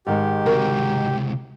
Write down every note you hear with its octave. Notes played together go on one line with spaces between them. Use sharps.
G#2 D#3 G#3 G4
C#2 C3 F#4 A#4